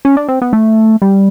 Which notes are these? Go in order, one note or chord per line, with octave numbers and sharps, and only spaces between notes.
C#4
D4
C4
B3
A3
G3